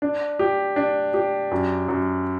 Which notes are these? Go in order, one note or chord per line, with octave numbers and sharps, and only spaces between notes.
D4
G4
D4
G4
F#2
F#2